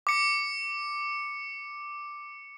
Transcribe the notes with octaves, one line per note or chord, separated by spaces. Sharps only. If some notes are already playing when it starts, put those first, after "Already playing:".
D6 C#7